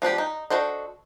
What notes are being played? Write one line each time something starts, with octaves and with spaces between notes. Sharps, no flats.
F3 B3 D4 G4
D#4
D4 F#4 A4 C5 D#5